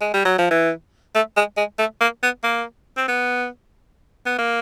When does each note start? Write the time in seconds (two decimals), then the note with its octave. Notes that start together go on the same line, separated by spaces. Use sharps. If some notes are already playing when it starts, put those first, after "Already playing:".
0.01 G#3
0.14 G3
0.25 F#3
0.38 F3
0.51 E3
1.15 A3
1.37 G#3
1.57 G#3
1.79 A3
2.01 A#3
2.23 B3
2.44 A#3
2.97 C4
3.08 B3
4.26 B3
4.38 A#3